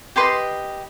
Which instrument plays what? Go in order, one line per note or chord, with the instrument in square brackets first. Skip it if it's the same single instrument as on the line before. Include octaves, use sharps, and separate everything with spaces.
[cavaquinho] G4 B4 D#5 G#5 C6